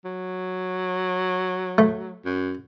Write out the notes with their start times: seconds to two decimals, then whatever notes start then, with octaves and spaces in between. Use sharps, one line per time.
0.05 F#3
1.78 A3
2.25 F#2